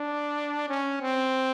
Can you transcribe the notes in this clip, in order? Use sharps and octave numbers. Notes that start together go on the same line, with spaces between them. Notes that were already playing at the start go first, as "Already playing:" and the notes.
Already playing: D4
C#4
C4